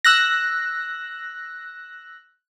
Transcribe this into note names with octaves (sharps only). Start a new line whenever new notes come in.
E6 F#6 A#6